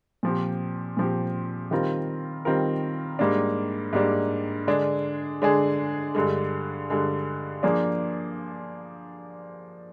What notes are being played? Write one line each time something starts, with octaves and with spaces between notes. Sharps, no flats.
A#2 F3 C4 G4
A#2 F3 C4 G4
D#3 G3 C4 F4 A#4
D#3 G3 C4 F4 A#4
G#2 G3 A#3 D4
G#2 G3 A#3 D4
D3 G#3 D4 G#4
D3 G#3 D4 G#4
G2 D3 G#3
G2 D3 G#3
F3 A#3 D4 G#4 D5